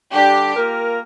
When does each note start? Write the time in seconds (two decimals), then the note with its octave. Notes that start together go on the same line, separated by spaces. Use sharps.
0.12 D3 G3 D4 G4
0.55 A#3 F4 A#4